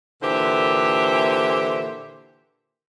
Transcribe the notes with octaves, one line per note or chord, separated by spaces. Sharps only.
A#2 D3 E3 G4 C5 E5